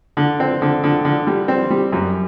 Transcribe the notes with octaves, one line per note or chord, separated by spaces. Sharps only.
D3
C4
D3
D3
D3
G3
C4
G3
F#2